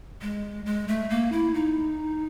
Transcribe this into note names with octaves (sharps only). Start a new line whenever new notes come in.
G#3
G#3
A3
A#3
E4
D#4